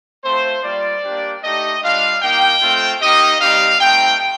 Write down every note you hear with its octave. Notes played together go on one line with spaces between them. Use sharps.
A3 C4 F4 C5
G3 A#3 F4 D5
A#3 D4 G4
A3 D#4 G4 D#5
G3 D4 F4 F5
A#3 D#4 G4 G5
A3 C4 F4
A#3 D#4 G4 D#5
G3 C4 D#4 G4 F5
A3 C4 D#4 G5